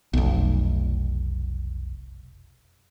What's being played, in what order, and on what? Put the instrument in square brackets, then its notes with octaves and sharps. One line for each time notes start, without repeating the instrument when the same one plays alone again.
[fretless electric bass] F1 B1